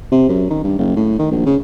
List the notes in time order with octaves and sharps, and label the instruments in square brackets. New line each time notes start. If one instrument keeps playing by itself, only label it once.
[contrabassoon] C3
F#2
D#3
G2
F#1
A2
D#3
A#1
C#3